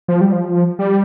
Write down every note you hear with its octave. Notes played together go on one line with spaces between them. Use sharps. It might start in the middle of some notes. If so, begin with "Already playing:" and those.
F3
G3
F3
G3